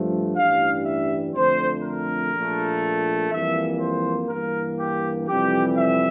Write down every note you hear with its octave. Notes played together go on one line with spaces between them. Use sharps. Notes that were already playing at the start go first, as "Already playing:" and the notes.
Already playing: G2 F3 A3
A1 G2 E3 G3 F5
E5
F2 D3 A3 C5
A#4
A#1 A#2 A3
F2 E3 G3 A#3 E5
C5
G2 E3 A#3 A#4
G4
F2 C3 E3 G3 G4
E5